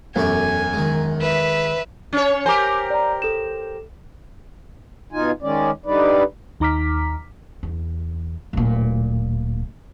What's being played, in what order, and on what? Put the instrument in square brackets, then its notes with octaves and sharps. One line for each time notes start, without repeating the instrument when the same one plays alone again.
[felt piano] E1 F#2 [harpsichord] A3 G4 [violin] G#5
[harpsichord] D#3 G#3
[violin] B4 E5
[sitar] C#4 C#5
[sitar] G4 A#4 C5 [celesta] G#5 D6
[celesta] D5 A#5
A4 E7
[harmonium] B2 D#4 F4 G#5
D#3 G#3 C#4 D5
D3 G3 D#4 B4 D5
[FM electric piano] D#2 D#4 A#5 D6 F6 B6
[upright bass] E2
D1 A#2